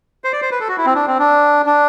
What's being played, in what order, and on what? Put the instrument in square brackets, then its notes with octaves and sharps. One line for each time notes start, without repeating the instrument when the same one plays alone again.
[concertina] C5
D5
C5
B4
A4
F#4
E4
C4
D4
C4
D4
D4